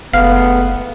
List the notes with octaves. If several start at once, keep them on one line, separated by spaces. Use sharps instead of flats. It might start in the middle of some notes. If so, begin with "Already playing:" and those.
F#1 G#3 A3 B3 F5 F6